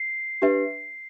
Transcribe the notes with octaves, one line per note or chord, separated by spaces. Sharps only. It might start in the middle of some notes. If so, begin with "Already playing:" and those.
Already playing: C7
D4 G4 B4 E5